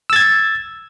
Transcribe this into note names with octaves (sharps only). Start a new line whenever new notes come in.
E6 G#6 A6